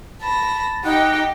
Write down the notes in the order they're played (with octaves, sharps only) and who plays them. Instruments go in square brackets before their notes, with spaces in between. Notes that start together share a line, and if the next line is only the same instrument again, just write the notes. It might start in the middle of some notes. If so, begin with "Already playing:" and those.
[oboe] A5 [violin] B5 A#6
[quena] D#4 [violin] G4 G5 [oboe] F#5